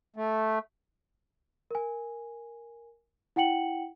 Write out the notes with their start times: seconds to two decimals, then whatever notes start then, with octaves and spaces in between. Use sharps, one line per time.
0.16 A3
1.71 A#4 G#5
3.36 E4 F#5 G5 C#7 F#7